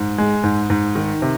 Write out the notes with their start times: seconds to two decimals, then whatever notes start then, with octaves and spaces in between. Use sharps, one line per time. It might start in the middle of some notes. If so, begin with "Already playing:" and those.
Already playing: G#2
0.18 G#3
0.43 G#2
0.70 G#2
0.95 D#3
1.22 C3